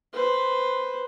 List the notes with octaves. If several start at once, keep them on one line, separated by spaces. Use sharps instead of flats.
B4 C5